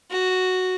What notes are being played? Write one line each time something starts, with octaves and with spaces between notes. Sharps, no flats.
F#4